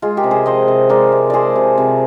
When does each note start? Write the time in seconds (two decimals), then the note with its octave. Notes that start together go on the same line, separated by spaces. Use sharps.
0.02 G#3 F4 G#4
0.17 G4 A#4
0.24 C3
0.31 G#4 C5
0.46 F3 C5 D#5
0.68 C3
0.89 G#3 A#4 D5
1.12 C3
1.30 F3 G#4 C5 D5
1.56 C3
1.78 C3